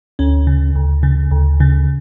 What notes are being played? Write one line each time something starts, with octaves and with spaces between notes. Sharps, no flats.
D2 C#4
C#3
D2
C#3
D2
C#3